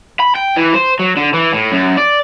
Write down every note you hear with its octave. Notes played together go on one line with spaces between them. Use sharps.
B5
G5
E3
C5
F#3
D3
E3
A2
F#2
D5